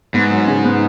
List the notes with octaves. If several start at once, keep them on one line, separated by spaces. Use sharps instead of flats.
G#2 B3
F#3
C#3
B3